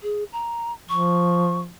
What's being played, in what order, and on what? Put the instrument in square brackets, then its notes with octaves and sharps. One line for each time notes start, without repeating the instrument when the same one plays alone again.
[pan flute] G#4
A#5
[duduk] F3 [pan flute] C#6